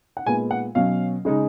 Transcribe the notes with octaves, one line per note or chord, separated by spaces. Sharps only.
F#5
A#2 G#3 B3 F4 G#5
F#5
B2 F#3 C#4 F5
C#3 G#3 D#4